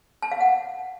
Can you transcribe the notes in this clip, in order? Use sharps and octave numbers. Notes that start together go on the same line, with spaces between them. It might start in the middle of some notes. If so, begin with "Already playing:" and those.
A5
F5
F#5